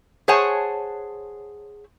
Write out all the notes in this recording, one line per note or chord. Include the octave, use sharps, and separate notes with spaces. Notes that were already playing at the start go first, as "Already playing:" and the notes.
G#4 C5 C#5 F#5 G#5 A5